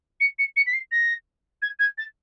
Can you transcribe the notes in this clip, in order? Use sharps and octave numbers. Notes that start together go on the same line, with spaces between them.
C#7
C#7
C#7
B6
C7
A#6
G#6
G#6
A6